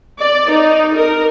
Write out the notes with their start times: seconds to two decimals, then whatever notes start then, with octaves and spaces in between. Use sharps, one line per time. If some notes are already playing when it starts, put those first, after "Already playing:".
0.19 D5
0.50 D#4
0.96 A#4